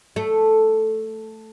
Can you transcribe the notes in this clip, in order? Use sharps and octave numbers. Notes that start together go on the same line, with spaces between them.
A3